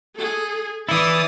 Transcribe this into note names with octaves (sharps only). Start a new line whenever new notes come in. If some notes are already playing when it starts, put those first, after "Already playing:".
G#4 A4
E3 E4 D5 D#6 A6